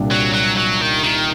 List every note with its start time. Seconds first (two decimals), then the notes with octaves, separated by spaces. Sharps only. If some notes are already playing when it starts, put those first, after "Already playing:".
Already playing: C2 A#2 G3 D4 G4
0.11 F#3
0.34 F#3
0.58 F#3
0.81 D#3
1.04 D#3